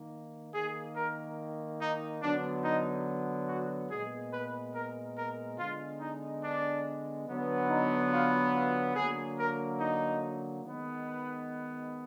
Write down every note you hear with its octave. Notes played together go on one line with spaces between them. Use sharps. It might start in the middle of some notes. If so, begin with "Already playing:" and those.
Already playing: D#3 A#3
D#3 A#3 G#4
A#4
D#4
D3 F#3 B3 D4
D#4
F#4
A#2 G#3 B3 G#4
B4
A#4
A#4
D3 G#3 B3 F4
D#4
D4
D3 F#3 B3
D#4
F4
F4
D3 F#3 A#3 G#4
A#4
D#4
D#3 G#3 B3
B4